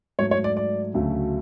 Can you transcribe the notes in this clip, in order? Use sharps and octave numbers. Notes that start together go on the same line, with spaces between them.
G#2 F#3 A3 C#5
C#5
D5
D5
D2 C#3 F#3 A3